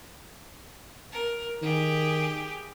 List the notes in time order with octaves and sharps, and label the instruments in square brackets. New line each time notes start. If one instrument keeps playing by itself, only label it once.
[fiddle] A#4
[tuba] D#3 [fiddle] G4 G#4